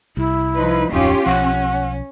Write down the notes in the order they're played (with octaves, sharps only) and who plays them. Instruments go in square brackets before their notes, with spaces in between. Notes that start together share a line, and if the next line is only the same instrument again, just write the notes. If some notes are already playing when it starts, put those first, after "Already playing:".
[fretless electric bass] C2 [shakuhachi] E4
[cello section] F3 D#4 B4
[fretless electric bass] D1 F2 [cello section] C#4 F4 G4 [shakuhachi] D#4
[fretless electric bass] B1 F3 [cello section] C#4 [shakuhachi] F#5